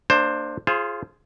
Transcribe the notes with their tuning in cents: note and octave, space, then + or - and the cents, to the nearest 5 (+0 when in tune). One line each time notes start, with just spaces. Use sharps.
A#3 -25 D4 +20 C5 +10
F4 -15 G#4 +10 C5 +20